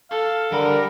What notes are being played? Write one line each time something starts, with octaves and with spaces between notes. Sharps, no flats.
A4 F5
D3 G3 A#4 B5